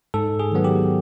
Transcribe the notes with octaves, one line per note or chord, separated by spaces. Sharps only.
G#2 A4
G#4
D#3 F#3 B3
G4